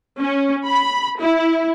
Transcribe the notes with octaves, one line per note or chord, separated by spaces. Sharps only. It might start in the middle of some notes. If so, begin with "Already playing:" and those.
C#4
B5
E4